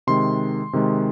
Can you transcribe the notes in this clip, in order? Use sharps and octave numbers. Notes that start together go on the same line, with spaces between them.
C3 D#3 G#3 C6
C3 D#3 G#3